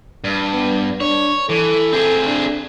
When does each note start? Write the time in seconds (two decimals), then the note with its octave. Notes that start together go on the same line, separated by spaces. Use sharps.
0.24 G2
0.54 B3
1.00 D4 C#5
1.49 E3 A4
1.93 C4 G#4
2.27 D4